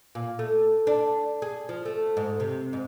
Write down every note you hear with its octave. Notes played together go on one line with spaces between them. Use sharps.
A#2
A3
D4
G#4
F3
A3
G#2
C3
G#2